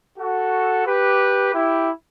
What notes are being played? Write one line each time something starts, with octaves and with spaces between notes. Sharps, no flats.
F#4 A4
G4 B4
E4 G4